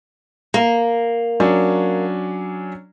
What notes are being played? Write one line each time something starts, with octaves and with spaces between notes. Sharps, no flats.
A#3
F#3 C#4 D4